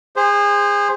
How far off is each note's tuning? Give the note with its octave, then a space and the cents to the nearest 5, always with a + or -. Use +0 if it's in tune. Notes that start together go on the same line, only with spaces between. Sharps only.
G#4 -30 C5 +0